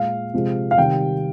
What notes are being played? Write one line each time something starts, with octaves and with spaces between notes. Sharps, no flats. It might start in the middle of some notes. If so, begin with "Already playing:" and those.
Already playing: A#2 G#3 F5
C3 F3 G#3
F5
C3 D#3 G3 G5